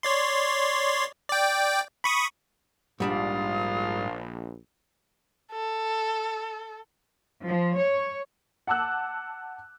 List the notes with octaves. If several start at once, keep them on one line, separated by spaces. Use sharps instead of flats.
C#5 D5 C6
D5 G5
B5 C#6 D#6
A#1 G#2 G3 D4 F4 D#6
A4
F3
C#5
F#5 A5 D6 E6 F#6